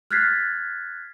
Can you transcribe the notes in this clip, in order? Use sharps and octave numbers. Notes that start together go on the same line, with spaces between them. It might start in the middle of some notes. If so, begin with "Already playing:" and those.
F6 F#6 G#6 A6 B6 C7